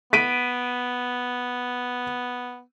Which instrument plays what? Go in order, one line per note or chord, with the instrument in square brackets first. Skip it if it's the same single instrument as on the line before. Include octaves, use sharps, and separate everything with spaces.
[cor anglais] B3 [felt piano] B6 D7 D#7